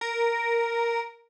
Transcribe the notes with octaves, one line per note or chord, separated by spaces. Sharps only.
A#4